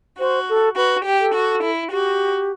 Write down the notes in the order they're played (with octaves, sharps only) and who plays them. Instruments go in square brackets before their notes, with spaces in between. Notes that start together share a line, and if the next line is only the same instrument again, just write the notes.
[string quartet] F#4 [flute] C5
[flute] A4
[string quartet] F#4 [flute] B4
[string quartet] G4
[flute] A4
[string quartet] F#4
E4
[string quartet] F#4 [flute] G4